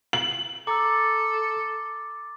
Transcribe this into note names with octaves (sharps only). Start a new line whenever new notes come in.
F#7
A4 A#5 D6 E6 A6